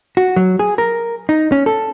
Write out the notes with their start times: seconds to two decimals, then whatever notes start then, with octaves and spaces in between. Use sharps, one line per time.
0.17 F#4
0.36 F#3
0.59 G#4
0.78 A#4
1.29 D#4
1.52 C#4
1.66 A4